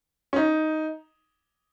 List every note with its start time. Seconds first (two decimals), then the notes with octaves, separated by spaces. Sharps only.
0.33 C#4
0.36 D#4